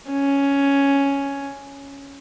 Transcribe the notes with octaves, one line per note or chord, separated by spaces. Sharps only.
C#4